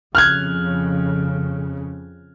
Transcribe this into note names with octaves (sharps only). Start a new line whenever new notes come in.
F2 C#3 F6 F#6 G#6